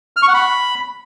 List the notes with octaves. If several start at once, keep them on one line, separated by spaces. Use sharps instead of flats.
F6
C#6
F#5
B5